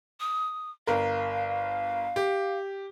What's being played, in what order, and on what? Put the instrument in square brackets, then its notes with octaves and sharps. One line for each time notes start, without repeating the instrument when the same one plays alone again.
[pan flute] D#6
[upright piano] G1 A#4 [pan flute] F5
[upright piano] G4